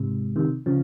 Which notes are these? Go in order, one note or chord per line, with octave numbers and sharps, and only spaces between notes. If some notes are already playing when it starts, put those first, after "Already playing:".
Already playing: G#2 C3 G#3
C3 D#3
C#3 F3